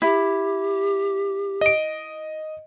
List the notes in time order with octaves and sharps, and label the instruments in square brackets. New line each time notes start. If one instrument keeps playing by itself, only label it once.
[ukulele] E4 [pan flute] G4
[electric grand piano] D#5 D7